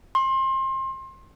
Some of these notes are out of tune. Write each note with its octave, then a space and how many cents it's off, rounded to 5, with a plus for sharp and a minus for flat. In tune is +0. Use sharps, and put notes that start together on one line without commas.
C6 +30